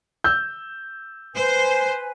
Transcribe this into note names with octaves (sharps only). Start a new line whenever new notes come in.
E6 G6
B4 C5 G#5